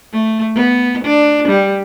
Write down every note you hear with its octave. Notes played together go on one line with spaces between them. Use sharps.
A3
B3
D4
G3